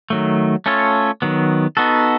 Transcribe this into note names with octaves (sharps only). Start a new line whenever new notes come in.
D#3 F#3 A3
A3 C#4 F4 A4 C#5
D#3 F#3 B3
B3 D#4 F#4 A4